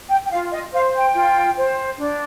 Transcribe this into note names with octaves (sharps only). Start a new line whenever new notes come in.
G5
G5
F4 F5
D#5
C5 F5
G5
F4
C5
D4